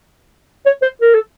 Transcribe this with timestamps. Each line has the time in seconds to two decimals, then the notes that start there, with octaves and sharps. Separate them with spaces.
0.66 C#5
0.82 C5
1.02 A#4
1.14 A4